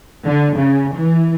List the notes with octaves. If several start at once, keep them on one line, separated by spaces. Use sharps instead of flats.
D3
C#3
E3